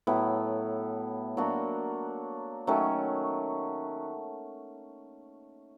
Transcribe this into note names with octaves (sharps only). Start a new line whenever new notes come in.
A2 F#3 B3
F#3 A#3 D4 F#4
D#3 F#3 A3 C#4